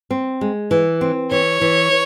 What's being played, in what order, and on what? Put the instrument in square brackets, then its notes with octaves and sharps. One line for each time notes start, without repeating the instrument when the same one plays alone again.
[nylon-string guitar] C4
G#3
E3
C4
[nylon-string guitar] E3 [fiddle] C#5
[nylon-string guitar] E3